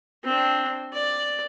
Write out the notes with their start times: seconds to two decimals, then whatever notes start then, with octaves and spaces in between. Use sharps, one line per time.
0.24 C4 D4
0.93 D5